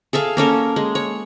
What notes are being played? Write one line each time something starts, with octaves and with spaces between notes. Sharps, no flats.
G#4 A4 E5 F5
A#3 C#4 A4 A#4
G#3
C#5